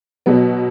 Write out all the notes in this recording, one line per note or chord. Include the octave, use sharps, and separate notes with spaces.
B2 F#3 B3